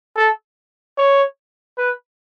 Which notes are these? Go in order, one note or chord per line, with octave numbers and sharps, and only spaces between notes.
A4
C#5
B4